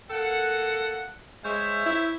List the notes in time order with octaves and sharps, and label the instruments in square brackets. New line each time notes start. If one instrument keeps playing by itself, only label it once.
[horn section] A#3 A4 F#5
[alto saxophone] G#3 [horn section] C5 C#5 E5
[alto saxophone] E4